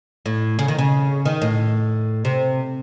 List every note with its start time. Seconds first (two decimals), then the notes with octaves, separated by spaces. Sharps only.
0.26 A2
0.59 C#3
0.68 D#3
0.78 C#3
1.25 D#3
1.42 A2
2.25 C3